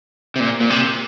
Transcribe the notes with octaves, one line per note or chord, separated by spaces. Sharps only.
C3
A#2
A#2
C3